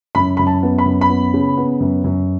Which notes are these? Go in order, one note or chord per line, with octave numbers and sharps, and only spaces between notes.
F#2 B5
F#2 B5
A5
B3
B5
F#2
B5
B3
C#3
B3
F#2
F#2